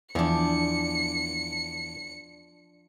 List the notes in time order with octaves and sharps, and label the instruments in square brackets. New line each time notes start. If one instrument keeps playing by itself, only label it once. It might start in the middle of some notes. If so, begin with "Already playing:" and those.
[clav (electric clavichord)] E2 [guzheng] F3 D4 [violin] C#7